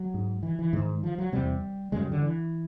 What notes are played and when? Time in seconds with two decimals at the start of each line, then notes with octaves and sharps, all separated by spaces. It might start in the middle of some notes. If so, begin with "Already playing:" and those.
Already playing: F#3
0.14 G#2
0.43 E3
0.59 E3
0.73 G#2 D#3
1.03 F3
1.18 F#3
1.33 E2 C3 G3
1.92 F#2 C#3 G#3
2.02 G3
2.12 D3
2.21 E3